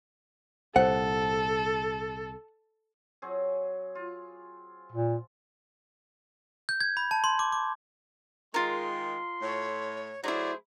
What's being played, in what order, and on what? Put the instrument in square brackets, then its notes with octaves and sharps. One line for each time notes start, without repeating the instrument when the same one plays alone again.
[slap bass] C2 A#2 [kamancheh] A4 [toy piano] C5 [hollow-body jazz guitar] F#5
[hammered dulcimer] F#3 C4 G#4
F4
[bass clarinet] A#2
[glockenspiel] G6
G#6
B5
A5
C6
D6
D6
[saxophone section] D#3 G#3 [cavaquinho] F4 A#4 [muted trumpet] C6
[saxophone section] A2 [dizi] C#5
[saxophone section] F#3 A3 G#4 [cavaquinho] D#4 E4 [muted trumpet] C5 [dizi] D5